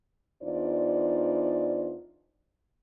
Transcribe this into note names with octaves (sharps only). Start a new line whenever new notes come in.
E2 D4 D#4 F4 C5 D5